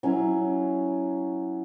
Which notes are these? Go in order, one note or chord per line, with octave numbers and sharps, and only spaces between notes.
F#3 C#4 E4